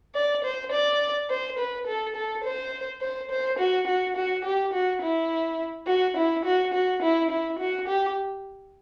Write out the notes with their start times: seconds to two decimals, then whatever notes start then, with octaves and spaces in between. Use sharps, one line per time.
0.15 D5
0.44 C5
0.72 D5
1.30 C5
1.58 B4
1.87 A4
2.16 A4
2.44 C5
3.01 C5
3.31 C5
3.59 F#4
3.87 F#4
4.16 F#4
4.45 G4
4.73 F#4
5.02 E4
5.87 F#4
6.17 E4
6.45 F#4
6.74 F#4
7.02 E4
7.30 E4
7.59 F#4
7.88 G4